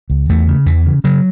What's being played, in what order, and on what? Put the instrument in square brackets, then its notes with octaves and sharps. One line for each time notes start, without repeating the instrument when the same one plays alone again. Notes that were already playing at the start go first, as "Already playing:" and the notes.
[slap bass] C#2
E2 A3
C#3
E2 E3
C#3
C#3 F#3